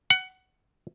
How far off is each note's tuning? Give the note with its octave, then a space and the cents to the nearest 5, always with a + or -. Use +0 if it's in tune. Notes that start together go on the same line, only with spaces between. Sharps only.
F#5 +15